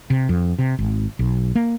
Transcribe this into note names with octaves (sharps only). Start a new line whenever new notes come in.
C3
F2
C3
G#1
B1
A#3